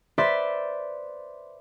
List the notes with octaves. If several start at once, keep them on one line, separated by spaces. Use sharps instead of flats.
B4 C5 D5 E5 C6 B6